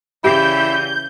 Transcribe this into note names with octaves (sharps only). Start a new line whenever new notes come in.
C#3 E3 E4 G4 D5 G6